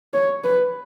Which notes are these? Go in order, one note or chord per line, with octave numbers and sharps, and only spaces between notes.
C#5
B4